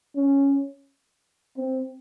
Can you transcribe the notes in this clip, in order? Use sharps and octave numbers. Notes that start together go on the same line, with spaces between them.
C#4
C4